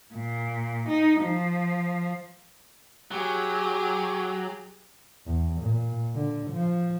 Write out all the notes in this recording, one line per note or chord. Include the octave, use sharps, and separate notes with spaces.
A#2
D#4
F3
F#3 G4 G#4
E2
A#2
D3
F3